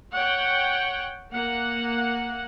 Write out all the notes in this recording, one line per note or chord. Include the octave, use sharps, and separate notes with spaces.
C#5 F#5 G5
A#3 F#5